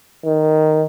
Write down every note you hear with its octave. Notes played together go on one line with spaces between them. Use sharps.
D#3